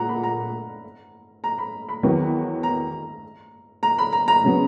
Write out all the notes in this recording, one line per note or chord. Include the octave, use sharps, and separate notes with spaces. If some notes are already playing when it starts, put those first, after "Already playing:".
Already playing: A#2 G#3 F#5 A#5
B5
A#5
A#5
B5
B5
E2 D#3 F#3 B3
A#5
A#5
B5
A#5
A#5
C#3 F#3 B3